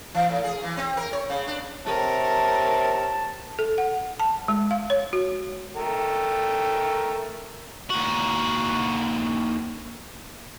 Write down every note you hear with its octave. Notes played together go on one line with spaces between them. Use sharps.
E3
A2
G#4
E3
C4
A#4
C#5
C#3
D4
C3 A#4 C#5 A5
A4
F#5
A5
G#3
F5
C#5
F#4
A3 A#4 G5
D#2 F#4